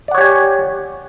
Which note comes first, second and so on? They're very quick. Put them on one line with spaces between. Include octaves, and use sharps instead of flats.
D5 F#5 C#5 G4 G#5